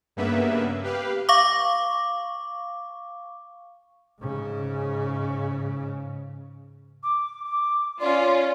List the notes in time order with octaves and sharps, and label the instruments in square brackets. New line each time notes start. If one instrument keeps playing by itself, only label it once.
[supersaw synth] G2 C#3 A#3 B3 B4 E5
G4 B4 F5
[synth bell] F5 C#6 D6
[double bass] G#2 C#3
[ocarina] D6
D6
[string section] C#4 F4 [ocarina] D5